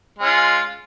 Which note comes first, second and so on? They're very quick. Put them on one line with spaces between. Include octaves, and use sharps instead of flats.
G#3 C#4 F4